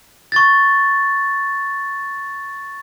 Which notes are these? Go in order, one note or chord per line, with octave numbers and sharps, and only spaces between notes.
C#6 A6